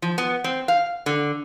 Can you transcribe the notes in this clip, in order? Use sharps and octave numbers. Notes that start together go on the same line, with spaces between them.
F3
B3
C4
F5
D3